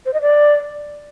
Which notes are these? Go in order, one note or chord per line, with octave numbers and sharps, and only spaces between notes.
C5
D#5
D5